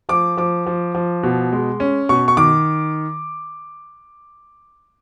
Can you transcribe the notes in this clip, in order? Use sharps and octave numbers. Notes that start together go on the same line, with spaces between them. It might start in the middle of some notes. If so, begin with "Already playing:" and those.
F3 D6
F3 D6
F3
F3
B2
G#3
C#4
B2 C#6
C#6
D#3 D6